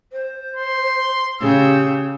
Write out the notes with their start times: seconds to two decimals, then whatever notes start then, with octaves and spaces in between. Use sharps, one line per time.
0.12 C5
0.56 C6
1.41 C#3 G4 E6